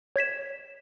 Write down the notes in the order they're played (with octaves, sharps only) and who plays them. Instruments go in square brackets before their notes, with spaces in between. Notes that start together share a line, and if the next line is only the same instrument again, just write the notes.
[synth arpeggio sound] C#5 G#6 B6 E7